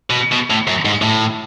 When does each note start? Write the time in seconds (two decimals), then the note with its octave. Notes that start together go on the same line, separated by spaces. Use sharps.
0.10 B2
0.32 B2
0.50 A2
0.68 F#2
0.85 G#2
1.02 A2